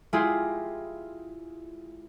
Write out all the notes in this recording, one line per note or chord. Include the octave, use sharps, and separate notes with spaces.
G#3 E4 F4 G4 G#4